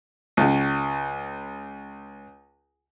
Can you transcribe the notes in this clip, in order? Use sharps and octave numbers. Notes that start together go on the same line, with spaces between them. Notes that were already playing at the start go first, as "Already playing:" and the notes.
C#2 C#3